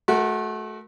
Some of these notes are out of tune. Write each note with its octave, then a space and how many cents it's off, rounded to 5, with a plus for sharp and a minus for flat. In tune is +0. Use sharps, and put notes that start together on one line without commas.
A3 -30 F#4 +0 A#4 +0